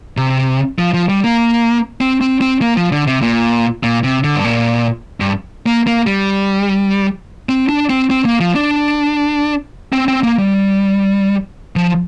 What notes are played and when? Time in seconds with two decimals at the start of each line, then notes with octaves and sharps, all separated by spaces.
0.17 C3
0.79 F3
0.94 F3
1.09 G3
1.24 A#3
2.01 C4
2.21 C4
2.41 C4
2.61 A#3
2.77 F3
2.92 D3
3.07 C3
3.22 A#2
3.83 A#2
4.04 C3
4.24 D3
4.35 G2
4.44 A#2
5.20 G2
5.66 A#3
5.87 A#3
6.07 G3
7.49 C4
7.69 D4
7.90 C4
8.10 C4
8.25 A#3
8.40 F3
8.55 D4
9.93 C4
10.08 C4
10.23 A#3
10.38 G3
11.76 F3